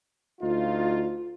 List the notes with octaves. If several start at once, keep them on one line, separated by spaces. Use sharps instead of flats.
D2 D#4 F4